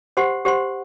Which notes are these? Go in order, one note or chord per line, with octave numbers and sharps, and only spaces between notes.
G4 C5 F#5 C6
G4 C5 F#5 C6